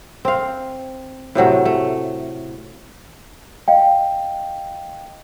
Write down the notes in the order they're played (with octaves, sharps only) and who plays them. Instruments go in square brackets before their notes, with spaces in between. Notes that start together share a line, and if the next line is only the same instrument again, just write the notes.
[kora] C4 F5
A2 C3 F#3 A3
A3
[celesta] D#5 F5 G5